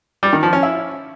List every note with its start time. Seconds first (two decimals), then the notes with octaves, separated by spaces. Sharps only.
0.23 G3
0.33 D#3
0.43 F3
0.53 C#4
0.63 E4